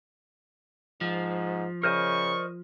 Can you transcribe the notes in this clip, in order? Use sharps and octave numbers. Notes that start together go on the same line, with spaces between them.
G#2 F3
C#3 A#4 C5 D5 D#5 C#6